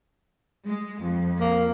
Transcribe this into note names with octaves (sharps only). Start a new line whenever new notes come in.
G#3
F2
A#3